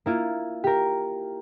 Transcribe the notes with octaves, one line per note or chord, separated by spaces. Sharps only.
A#3 E4 F4
G4 A#4